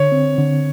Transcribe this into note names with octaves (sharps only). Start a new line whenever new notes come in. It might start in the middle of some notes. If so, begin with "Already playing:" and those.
Already playing: D3 C#5
C4
D3